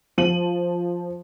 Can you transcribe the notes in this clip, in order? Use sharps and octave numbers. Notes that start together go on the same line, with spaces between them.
F3 D#7 F#7